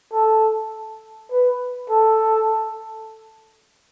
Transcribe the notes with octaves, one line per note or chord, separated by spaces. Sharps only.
A4
B4
A4